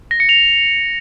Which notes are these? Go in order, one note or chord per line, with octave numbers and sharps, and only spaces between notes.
A#6
C#7
F7